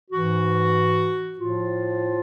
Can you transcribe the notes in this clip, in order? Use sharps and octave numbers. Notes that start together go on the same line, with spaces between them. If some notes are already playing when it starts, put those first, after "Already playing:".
G#2 E3 F#4
A2 F3 F4